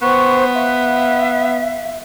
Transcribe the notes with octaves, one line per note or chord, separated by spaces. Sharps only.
B3 C5 G5 C#6
E5 F5